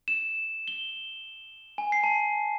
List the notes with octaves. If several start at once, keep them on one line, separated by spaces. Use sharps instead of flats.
E7
G7
G#5
C7
A5